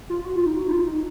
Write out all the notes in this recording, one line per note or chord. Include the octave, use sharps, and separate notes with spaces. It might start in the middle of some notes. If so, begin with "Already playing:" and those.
F4
F#4
F4
D#4
F#4
D#4
F4
D#4